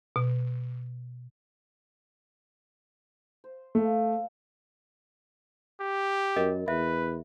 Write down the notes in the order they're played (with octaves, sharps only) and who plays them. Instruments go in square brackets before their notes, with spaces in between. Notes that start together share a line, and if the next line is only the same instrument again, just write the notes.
[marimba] B2
[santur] C5
[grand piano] A3 [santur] D#5 F5 A5
[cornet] G4
[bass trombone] F#2 [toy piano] A#4 D#5
[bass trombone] E2 [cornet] B4 [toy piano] E5